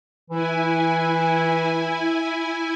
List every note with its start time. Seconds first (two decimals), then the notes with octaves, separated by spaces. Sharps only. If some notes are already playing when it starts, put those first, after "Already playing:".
0.30 E3 E4 G#5